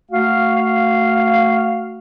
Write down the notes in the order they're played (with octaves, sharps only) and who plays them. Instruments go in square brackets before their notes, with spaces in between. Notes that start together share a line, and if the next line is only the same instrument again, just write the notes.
[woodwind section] A3 F#4 F5